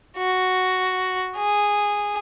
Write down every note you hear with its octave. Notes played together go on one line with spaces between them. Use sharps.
F#4
G#4